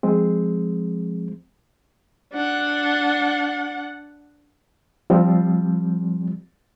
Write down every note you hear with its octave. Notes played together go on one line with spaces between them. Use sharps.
F3 G#3 C4
D4 F#5
F3 G3 C4